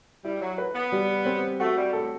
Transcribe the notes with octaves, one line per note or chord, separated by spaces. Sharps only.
G3 E4
F#3
B4
B3
G3
C4
A3 F#4
G3
A2 A4